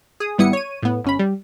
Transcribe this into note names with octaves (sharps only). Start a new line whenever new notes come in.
G#4 D#6
G#1 G3 B3 E4 D#6 C#7
C#5 D#7
A2 B3
G1 C#4 B5
G3